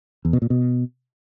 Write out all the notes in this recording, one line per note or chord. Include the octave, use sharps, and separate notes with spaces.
E2
B2
A#2
B2